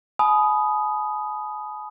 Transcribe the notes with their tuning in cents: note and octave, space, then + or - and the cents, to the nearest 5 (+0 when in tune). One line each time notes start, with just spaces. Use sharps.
G#5 +40 B5 +0 D#6 +0